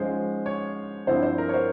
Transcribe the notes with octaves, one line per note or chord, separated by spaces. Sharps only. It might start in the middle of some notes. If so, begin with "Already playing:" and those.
Already playing: G#2 F3 G#3 C#4 C5
C#5
G2 F3 C4 E4 C5
C5
A#4
C#5
C5